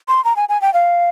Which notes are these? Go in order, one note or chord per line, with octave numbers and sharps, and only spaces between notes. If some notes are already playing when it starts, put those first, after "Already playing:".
C6
A#5
G#5
G#5
G5
F5